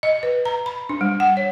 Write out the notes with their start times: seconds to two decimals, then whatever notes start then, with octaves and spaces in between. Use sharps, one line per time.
0.03 D#5
0.23 B4
0.45 A#5
0.66 B5
0.89 D4
1.01 G3
1.20 F#5
1.37 C#5